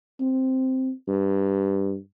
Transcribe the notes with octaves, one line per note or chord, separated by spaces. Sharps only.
C4
G2